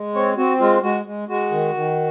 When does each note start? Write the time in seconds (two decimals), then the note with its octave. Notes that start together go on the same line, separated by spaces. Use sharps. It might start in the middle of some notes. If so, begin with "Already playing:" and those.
Already playing: G#3
0.15 C4 C#5
0.37 C4 F#4
0.60 G#3 F4
0.82 G#3 F#4
1.06 G#3
1.28 G#3 F#4
1.51 D#3
1.74 D#3